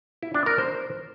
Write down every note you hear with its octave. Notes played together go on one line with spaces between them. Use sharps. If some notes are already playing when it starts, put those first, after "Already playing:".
E4
D4
A#4
C5